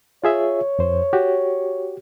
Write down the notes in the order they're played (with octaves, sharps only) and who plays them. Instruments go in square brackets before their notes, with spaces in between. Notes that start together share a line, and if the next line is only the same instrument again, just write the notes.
[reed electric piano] F4 G#4 E5 [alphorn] C#5
[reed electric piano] F2 C5
F#4 G4